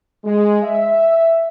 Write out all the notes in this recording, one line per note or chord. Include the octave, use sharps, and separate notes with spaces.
G#3
E5